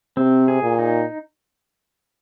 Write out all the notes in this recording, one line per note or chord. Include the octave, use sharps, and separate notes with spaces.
C3 C4
G#4
A#2
D#4